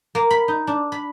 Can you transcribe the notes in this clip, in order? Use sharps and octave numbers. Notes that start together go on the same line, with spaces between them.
A#3
B5
D#4
D4
B5